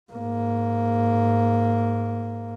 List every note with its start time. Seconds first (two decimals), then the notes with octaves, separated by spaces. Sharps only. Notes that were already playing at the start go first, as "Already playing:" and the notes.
0.12 G#2 A#3